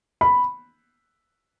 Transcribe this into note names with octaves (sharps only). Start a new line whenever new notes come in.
B5